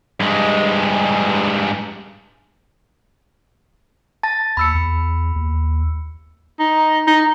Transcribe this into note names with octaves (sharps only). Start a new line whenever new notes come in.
G2 G#3
A5 A6 A#6
D#2 B5 E6 C#7
E2
D#2
D#4
D#4